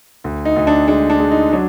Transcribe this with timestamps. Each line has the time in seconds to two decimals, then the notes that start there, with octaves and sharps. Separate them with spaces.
0.24 D2
0.45 D#4
0.56 D2
0.67 D4
0.88 G#3 D4
1.10 D4
1.20 G#3
1.31 D#4
1.53 F#3 D4